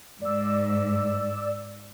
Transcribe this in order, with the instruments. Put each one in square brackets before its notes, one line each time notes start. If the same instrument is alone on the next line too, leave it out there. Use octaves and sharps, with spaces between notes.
[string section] G#2 [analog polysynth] D5 E6